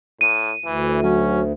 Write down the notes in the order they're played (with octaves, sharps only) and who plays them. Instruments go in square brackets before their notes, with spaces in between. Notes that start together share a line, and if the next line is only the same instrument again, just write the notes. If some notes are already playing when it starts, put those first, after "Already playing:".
[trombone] A2 [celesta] D#7
[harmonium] D2 [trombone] E3
[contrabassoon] F#3 [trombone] C#4